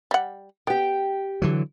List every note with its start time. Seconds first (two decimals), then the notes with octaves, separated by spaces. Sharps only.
0.11 G3 F#5
0.67 B3 G4 G5
1.42 D3 E3 F#3